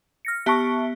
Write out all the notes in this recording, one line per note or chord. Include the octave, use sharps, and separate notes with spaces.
F6 A#6 C#7
B3 G4 E5 A5 C#6